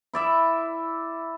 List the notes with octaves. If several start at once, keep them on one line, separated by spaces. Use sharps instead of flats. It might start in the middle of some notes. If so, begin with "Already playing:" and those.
E4 D5 E5